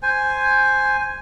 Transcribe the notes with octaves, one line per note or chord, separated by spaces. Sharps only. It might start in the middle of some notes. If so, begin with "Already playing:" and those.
C5 G#5